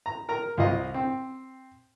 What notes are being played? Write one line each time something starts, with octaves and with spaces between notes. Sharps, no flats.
A#5
A#4 A#5
C2 F4 D#5
C4